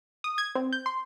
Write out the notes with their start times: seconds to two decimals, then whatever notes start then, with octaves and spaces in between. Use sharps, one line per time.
0.24 D#6
0.38 G#6
0.55 C4
0.73 G6
0.86 C6